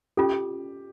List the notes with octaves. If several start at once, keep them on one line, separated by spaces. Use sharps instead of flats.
C#4 F4 G4 A4